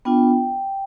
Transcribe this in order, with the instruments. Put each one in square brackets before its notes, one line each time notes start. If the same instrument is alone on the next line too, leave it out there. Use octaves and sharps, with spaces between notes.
[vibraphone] B3 D4 F4 G5